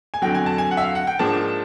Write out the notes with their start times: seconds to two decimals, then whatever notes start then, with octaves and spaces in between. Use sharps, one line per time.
0.14 G#5
0.22 F2 D3 F#3 G5
0.34 G#5
0.46 A5
0.58 G#5
0.71 F#5
0.77 E5
0.82 F5
0.95 F#5
1.07 G5
1.19 G#2 F3 A#3 D4 A5